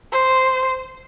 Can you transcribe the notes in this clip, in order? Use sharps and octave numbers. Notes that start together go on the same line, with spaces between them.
C5